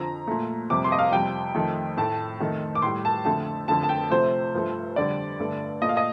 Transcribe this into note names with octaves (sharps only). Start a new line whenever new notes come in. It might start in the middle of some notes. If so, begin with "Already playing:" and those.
Already playing: F2 D3 F3 A#5
A#2 A3
F2 C3 G3 D6
C6
D#5
F5
F2 C3 G3 G5
F2 D#3 A3
A2 A3 A5
F2 D#3 A3
D6
A2 G3 C6
A5
F2 D3 A3 A5
F2 D3 A3 A5
A5
G5
C3 F3 A3 C5
G2 F3 A3
F2 D3 G3 D5
G2 D3 A3
A#2 A3 D#5
F5
D#5